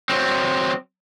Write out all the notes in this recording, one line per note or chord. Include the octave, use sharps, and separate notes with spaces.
F#3 C4